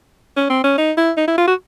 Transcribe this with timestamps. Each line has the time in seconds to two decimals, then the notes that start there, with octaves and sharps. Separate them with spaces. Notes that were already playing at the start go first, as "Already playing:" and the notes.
0.37 C#4
0.50 C4
0.64 C#4
0.78 D#4
0.97 E4
1.17 D#4
1.28 E4
1.38 F4
1.48 F#4